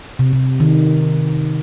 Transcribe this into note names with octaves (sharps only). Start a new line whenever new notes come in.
C3
C3
D#3